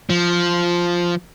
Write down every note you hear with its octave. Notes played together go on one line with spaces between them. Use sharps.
F3